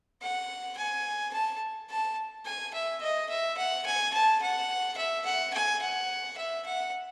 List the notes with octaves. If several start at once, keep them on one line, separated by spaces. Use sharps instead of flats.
F#5
G#5
A5
A5
G#5
E5
D#5
E5
F#5
G#5
A5
F#5
E5
F#5
G#5
F#5
E5
F#5